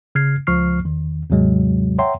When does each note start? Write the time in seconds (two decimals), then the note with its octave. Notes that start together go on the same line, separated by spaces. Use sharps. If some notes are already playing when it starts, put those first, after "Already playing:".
0.15 C#3 F6 G#6 C7
0.47 C#2 F3 C#6 F6 C7
0.85 E2 D#3
1.30 D#2 G#2 C3 F#3 G#3
1.99 C#5 E5 F#5 G5 A#5 C6